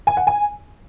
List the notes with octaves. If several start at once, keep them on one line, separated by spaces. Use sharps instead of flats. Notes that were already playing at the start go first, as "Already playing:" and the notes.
G#5
F#5
G#5